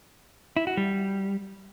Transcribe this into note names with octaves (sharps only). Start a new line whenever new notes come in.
E4
F#4
G3